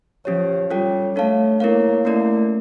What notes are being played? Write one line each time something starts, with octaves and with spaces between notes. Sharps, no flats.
F3 C#4 G4 C#5
G3 C#4 F4 A4 C#5 G5
A3 D4 A4 C#5 F5 A5
A#3 E4 A#4 C#5 F5
A3 A#3 C#4 E4 A#4 D5